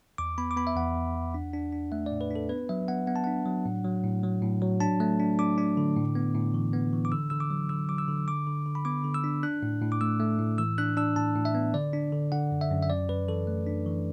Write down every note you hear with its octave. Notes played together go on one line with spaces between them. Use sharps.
E2 D6
B3 B5
D6
B3 B5
E5
E2 F#5
E2
E2
D4
D4
D4
A3 E5
A2 D5
B4
D4 A4
B3 B4
F#3 E5
B3 F#5
B3 F#5
A5
D4 F#5
F#3
A2
F#3
A2
F#3
A2
F#3
D4 A5
A3
D4
D4 D6
D4
D3
A2
B3
A2
E3
B3
E3
D6
D3 E6
D3 E6
D6
F#3
D3 E6
F#3 D6
E6
D3
D3 D6
D3
D3
B5
B3 D6
D3
E6
D4
D4 F#6
A2
A2
D6
A3 E6
A3
A2
E3 E6
D4 F#6
D4 E6
A2 A5
A2
E5
B3
D3 D5
D4
D3
D3 F#5
F#2
E5
F#2
E5
F#2 D5
F#2 B4
E3 A4
A3
D4
E3